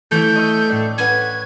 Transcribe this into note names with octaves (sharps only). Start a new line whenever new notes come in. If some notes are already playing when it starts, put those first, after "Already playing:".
E3 A3 C#4 E4 G6
D#5 C#6 E6
A2 D4
C#4 B4 F#5 G#6